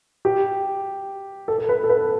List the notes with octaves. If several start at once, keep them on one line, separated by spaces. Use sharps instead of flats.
G4
A4
A4
B4
A4
B4